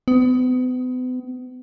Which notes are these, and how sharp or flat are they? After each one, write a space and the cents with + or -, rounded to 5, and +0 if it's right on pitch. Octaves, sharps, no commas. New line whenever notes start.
B3 +40